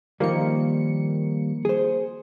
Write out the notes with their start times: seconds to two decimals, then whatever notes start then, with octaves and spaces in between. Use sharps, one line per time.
0.20 D#3 F3 G3 A#3 C#7
1.65 G#4 C5